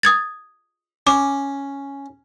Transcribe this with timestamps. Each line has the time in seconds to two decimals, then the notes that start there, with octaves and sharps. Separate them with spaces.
0.03 D#6 G#6 A6
1.07 C#4 D6